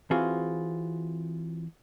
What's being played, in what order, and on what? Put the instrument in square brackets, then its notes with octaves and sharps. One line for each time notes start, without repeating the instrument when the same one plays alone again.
[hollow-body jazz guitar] E3 C4 F4 F#4 G#4